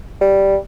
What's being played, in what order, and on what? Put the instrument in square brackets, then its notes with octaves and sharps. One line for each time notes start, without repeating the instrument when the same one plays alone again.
[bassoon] G3